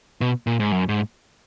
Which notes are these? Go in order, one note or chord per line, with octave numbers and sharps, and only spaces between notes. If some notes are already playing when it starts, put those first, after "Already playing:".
B2
A#2
G#2
F#2
G#2